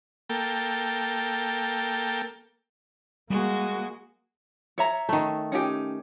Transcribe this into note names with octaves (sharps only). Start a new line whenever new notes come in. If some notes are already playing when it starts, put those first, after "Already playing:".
A#3 A4 G5
G3 G#3 A#3 F#4
C#5 E5 A#5
D#3 A3
C#4 D#4 G4